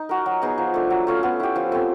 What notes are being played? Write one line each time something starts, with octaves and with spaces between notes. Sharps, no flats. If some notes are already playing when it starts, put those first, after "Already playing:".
Already playing: D#4
F#4 A#4
F#3
B3 D#4 G#4
F3
A3 D4
F#3
A3 C#4 F4
B3
E4 G4
F3
A3 C4